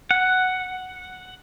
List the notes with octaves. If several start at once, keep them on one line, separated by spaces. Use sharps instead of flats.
F#5